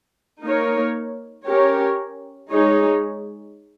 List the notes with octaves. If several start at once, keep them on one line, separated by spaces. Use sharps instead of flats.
A#3 D#4 A#4 C#5
C#4 G4 A#4 C#5
G#3 D#4 G#4 C#5